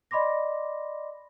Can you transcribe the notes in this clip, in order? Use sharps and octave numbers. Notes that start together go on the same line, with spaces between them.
D5 D#5 B5 C6 D6 A#6